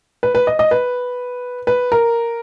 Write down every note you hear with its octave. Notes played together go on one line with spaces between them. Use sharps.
B4
B4
D#5
D#5
B4
B4
A#4